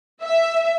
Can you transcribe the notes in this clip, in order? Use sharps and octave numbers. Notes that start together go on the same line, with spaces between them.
E5